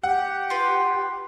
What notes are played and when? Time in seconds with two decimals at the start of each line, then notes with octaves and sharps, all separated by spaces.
0.03 G4 F#5
0.50 F4 B4